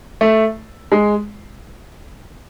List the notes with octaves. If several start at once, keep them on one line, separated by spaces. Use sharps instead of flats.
A3
G#3